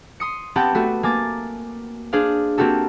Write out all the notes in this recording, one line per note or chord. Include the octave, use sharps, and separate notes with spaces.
C6 D#6 C#7
B3 C4 G4 F#5 G5 A5
A3 B3 F#4
A#3 G#5 D6 A6
D4 G#4 C5 D5 F5
A#3 C4 F#4 G4 A4